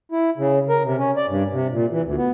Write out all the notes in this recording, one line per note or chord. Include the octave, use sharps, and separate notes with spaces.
E4
C#3
A#4
C3
C#4
D5
G2
C3
A#2
E3
D2
B3